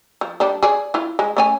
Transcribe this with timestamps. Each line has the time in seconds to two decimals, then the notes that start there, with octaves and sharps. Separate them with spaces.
0.21 F3
0.40 G3 D4
0.63 G#4 D5
0.94 E4 F4
1.19 G#3
1.37 A3 C#4 G#5